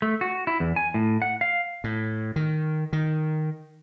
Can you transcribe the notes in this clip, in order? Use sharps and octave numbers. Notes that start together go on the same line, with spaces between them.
A3
F#4
E4
E2
G#5
A2
F#5
F5
A2
D#3
D#3